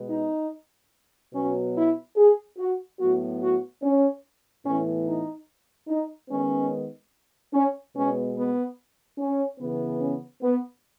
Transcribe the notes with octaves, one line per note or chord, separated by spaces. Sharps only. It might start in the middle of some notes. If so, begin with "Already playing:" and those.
Already playing: B2 G#3 B3
D#4
B2 F#3 B3 C#4
E4
G#4
F#4
A2 F#3 B3 F#4
F#4
C#4
A2 E3 B3 C#4
D#4
D#4
D#3 G#3 B3 C#4
C#4
B2 G#3 B3 C#4
B3
C#4
C#3 E3 B3
C#4
B3